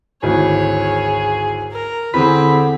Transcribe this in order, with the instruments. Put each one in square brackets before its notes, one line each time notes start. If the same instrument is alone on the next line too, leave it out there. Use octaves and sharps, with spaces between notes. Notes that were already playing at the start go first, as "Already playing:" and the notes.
[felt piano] G#1 D2 E3 [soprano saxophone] G#4 [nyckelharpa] C#5
[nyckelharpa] A#4
[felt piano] E2 [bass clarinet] D3 [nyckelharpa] C4 G#4 [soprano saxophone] B5